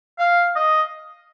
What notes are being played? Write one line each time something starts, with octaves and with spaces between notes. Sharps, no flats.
F5
D#5